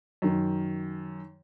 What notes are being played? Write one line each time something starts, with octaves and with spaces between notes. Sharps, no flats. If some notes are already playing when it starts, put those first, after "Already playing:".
F#2 D#3